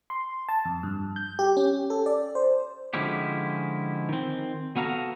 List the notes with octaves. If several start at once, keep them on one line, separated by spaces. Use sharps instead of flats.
C6
A5
F2
G2
G6
G4
C#4
A4
D5
C5
D3 F3 G#3 C#4 E4 G4
D#3 C4
B3 F#4 A4 F5 A#5